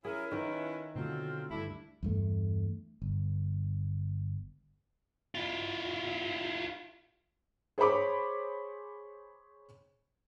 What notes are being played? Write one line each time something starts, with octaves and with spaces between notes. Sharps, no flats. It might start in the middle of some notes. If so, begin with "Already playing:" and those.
C#4 E4 G#4 A#4
D#3 A#4 B4
B2 D3 F#3 A3 C4 F4
D2 G2 D4 E4 A4
E2 G2 A3
G1
E4 F4
G#4 C5 C#5 B5 D6